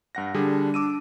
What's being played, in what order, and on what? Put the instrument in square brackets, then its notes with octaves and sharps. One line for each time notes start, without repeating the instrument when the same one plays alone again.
[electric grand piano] G2 F#5 A#6
[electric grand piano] D3 G3 G#4 [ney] D4
[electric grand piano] D6 E6 D#7